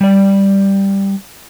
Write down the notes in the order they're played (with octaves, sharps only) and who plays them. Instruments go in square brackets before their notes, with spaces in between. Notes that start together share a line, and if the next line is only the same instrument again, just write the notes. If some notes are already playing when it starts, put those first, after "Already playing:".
[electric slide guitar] G3 D5